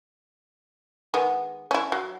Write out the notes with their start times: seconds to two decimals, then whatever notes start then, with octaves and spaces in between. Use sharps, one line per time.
1.14 D#3 G#3 B3
1.71 C#4 E4
1.92 F#3